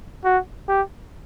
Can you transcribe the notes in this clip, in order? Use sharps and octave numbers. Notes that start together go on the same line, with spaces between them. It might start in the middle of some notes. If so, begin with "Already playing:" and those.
F#4
G4